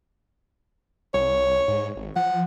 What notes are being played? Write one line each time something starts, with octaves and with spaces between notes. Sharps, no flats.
C2 C#5
G#2
G#1
F3 F#5